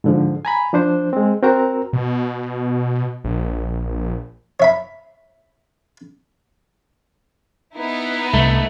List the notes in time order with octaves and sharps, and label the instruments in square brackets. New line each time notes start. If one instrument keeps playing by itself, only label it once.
[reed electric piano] G#2 D3 F3
G#5 A#5 B5
F3 D4 C5
G#3 C4
C4 F#4 A#4 A#5
[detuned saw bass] B2
A#1
[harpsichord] C#5 E5 B5
[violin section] B3 D#4 E4
[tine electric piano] C2 [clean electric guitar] A3